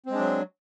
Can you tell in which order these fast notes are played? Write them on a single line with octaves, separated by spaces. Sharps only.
C4 G#3 D4 F#3